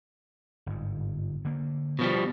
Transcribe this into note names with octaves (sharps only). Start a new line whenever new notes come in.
G1 G#2
D3 A#3
B2 F3 G3